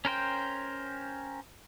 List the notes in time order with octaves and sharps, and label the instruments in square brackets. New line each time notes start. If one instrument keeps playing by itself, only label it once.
[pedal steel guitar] C#4 A#4 C5 G5